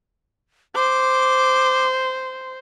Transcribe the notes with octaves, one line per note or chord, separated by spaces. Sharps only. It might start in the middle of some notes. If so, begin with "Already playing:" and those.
C5 D6